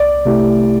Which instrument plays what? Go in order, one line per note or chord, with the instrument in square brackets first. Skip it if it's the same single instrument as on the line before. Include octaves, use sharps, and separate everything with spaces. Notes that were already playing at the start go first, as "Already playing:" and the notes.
Already playing: [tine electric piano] C2 [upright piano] D5
[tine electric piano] C3 A3 E4 G4